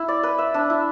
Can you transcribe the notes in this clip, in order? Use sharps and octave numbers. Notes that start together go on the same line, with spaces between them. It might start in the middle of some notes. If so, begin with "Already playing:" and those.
Already playing: E4
D5
B4
E5
D4
E4